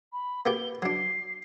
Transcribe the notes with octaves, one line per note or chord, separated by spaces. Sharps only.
B5
A#3 B3 G4 G7
F#3 D4 C7